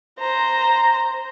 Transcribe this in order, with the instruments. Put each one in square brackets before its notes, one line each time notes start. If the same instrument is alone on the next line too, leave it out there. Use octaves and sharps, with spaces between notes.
[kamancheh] C5 A#5